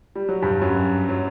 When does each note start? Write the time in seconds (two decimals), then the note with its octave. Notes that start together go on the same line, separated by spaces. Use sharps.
0.16 G3
0.29 F#3
0.42 G2 G3
0.61 F#2 F#3
1.09 F#3